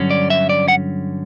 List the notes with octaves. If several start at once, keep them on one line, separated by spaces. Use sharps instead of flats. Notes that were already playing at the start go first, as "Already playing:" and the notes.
Already playing: G2 D3 F#3 C#4
D5
E5
D5
F#5